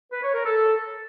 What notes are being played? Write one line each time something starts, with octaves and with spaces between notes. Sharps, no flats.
B4
C#5
A#4
A4